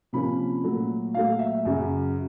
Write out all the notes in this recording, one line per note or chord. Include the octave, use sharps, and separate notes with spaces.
C3 F3 A#3 C#4 B5
A#2 F#3 A3
A#2 F#3 A3 F5
E5
F#2 C#3 F#3